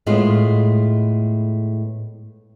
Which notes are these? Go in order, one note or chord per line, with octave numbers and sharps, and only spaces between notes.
A2 G#3 A3 B3 F4